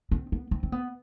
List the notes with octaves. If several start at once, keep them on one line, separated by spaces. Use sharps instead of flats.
C4
B3
C4
C4
B3